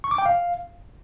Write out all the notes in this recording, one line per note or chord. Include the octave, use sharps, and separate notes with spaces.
C#6
D6
G5
F5